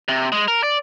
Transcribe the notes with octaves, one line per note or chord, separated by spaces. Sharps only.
C3
G#3
A#4
D5